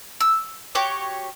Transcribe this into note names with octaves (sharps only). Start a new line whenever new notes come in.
E6
F#4 G4 C#5 D6